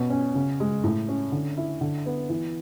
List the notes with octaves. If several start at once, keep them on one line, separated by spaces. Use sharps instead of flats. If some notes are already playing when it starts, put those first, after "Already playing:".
Already playing: B2 C#4
C#4
C#3
G#3
A2
C#4
D3
E4
D3
B3
E3